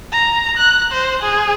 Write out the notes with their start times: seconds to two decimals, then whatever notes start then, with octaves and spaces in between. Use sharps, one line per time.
0.12 A#5
0.57 F#6
0.92 C5
1.22 G#4